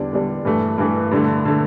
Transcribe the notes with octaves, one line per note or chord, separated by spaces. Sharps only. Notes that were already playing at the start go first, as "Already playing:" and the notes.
Already playing: E2 D3 G3 D4
E2 D3 G3 D4
G2 E3 A3
G2 E3 A3
G2 D3 A3
D3 A3